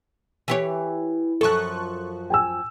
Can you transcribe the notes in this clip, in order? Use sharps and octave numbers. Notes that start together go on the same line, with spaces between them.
E3 G4 C#5
F#2 F3 A4 C#6 F#6
G5 G#5 E6